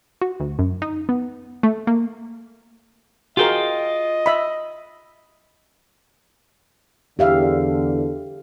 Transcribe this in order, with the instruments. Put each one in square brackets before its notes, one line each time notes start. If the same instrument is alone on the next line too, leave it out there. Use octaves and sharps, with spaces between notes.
[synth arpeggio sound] F#4
D2
F#2
D#4
B3
A3
A#3
[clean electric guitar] F4 G5 [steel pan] F#4 G#4 A#4 [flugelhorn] D#5
[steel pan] E5 B5
[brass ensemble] E2 D3 [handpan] G4 E5 F5